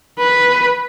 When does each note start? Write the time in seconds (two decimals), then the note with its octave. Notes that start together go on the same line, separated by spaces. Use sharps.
0.19 B4